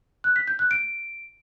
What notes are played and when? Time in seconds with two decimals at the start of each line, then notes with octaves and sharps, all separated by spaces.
0.24 F#6
0.36 B6
0.47 G6
0.59 F#6
0.71 D7